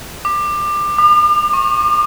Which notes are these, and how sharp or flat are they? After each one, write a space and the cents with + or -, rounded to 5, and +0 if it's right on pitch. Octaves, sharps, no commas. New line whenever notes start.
D6 +25
D6 +45
C#6 -30